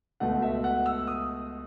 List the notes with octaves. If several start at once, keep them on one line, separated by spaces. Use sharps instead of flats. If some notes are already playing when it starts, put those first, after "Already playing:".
C#2 B2 A3 F#5
E5
F#5
E6
D#6